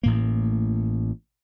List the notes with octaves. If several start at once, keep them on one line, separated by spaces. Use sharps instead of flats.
A1 A2 A#3